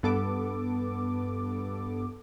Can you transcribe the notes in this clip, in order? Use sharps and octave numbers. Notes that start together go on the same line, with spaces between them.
G2 B3 A4 D6